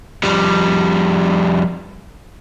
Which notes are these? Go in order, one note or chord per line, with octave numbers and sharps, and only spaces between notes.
F2 G3